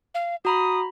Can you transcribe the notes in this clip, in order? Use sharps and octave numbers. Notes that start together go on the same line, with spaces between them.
F5
F#4 A#5 B5 D#6